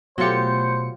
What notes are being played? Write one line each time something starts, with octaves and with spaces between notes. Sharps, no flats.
B2 F#3 A3 F4 G4 C5 C#7